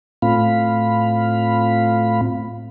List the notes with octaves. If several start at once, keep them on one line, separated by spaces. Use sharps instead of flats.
A2 A3 C4 F4 F5 B5